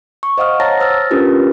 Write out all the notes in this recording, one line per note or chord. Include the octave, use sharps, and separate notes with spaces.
C#6
C5 D#5 F5 F#5 D#6 F6
C#5 F#5 A5 A#5 A6 A#6
C5 E6 F6 A6
C#4 D4 F4 G4 A#4 B4